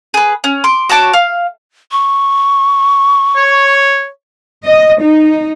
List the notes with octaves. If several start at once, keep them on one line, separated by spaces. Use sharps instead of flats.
G#4 B4
C#4
C6 D6
F#4 C#5 A5 D6
F5
C#6
C#5
D#5
D#4